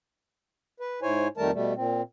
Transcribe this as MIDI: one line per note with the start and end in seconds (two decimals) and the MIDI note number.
0.80 1.00 71
1.02 1.28 44
1.02 1.28 64
1.02 1.28 72
1.02 1.28 73
1.02 1.28 80
1.37 1.51 41
1.37 1.51 51
1.37 1.51 55
1.37 1.51 57
1.37 1.51 70
1.37 1.51 81
1.53 1.74 47
1.53 1.74 55
1.53 1.74 57
1.76 2.02 46
1.76 2.02 60